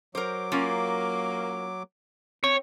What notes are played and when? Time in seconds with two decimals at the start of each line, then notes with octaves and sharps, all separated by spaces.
0.15 F#3 A#4 C5 D6
0.52 A#3 C#4 F4 F#4
2.44 C4 C#5